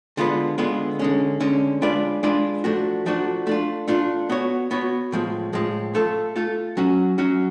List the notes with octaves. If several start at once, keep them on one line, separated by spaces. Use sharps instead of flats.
D3 G#3 B3 F4 B4
D3 G#3 B3 F4 B4
D3 G#3 C#4
D3 G#3 C#4
G#3 D4 F4 B4 D5
G#3 D4 F4 B4 D5
F3 A3 D4 F#4
F3 A3 D4 F#4
A3 D4 F4
A3 D4 F4
B3 F#4 C#5
B3 F#4 C#5
A2 F3 G#3
A2 F3 G#3
A3 F4 A4
A3 F4 A4
F#3 C#4 F#4
F#3 C#4 F#4